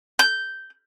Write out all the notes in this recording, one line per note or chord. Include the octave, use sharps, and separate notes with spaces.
G6